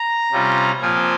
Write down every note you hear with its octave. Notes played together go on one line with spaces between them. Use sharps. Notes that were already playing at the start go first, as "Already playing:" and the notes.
Already playing: A#5
C3 G3 C#4 F4
A#2 F3 C4 F4 G#5